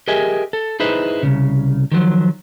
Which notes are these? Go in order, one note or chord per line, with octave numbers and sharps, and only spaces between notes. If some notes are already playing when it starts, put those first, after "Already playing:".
G4 G#4 A#4 D#5 E5 G#5
A4
D#4 E4 G#4 B4 C5 D#5
C2 G#2 C#3
D#3 F3 F#3